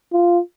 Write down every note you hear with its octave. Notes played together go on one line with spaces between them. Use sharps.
F4